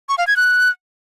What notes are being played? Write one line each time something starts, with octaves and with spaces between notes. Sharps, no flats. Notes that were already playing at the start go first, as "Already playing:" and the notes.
C#6
F5
G#6
F#6